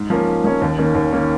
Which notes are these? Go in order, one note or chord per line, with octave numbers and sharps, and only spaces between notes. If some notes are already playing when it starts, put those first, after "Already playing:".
Already playing: G#2
F3 A#3 C#4
G#2
F3 A#3 C#4
D#2
D#3 A#3 C#4
D#2
D#3 A#3 C#4